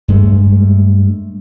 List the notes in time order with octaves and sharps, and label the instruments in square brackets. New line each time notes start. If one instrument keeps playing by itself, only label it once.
[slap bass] G2 G#3 A3